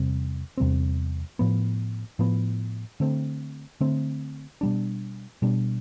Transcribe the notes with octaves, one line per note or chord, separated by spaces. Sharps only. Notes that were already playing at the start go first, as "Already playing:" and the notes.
Already playing: E2 C3 G3 C4
E2 C3 G3 C4
A2 F3 B3
A2 F3 B3
D3 A3 C4
D3 A3 C4
B2 G3 D4
B2 G3 D4